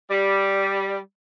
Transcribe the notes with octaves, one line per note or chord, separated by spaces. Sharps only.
G3